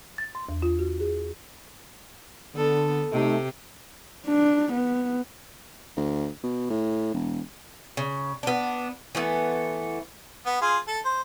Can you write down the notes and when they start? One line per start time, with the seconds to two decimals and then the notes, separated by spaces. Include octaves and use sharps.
0.18 A6
0.35 C6
0.49 E2
0.62 F4
0.79 F#4
1.00 G#4
2.55 D3 B3 A4
3.11 C3 A3 D#4 G4
4.27 D4
4.73 B3
5.97 D2
6.43 B2
6.70 A2
7.14 E1
7.97 C#3
8.43 B3 D4
9.15 E3 A3 B3
10.46 B3
10.62 F4 G#4
10.87 A4
11.05 C5